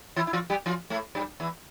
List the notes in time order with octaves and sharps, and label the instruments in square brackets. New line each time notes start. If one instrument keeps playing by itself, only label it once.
[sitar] E3 E4
E4
F3 F4
G3 G4
F3 F4
A2 A3
G2 G3
E2 E3